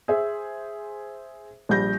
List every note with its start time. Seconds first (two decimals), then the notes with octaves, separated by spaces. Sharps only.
0.08 G#4 C5 E5
1.69 A#1 G3 G6 A#6